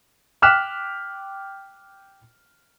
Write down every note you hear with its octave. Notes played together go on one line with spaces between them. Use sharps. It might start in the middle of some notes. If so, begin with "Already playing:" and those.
G5 D6 F6 F#6 B6 E7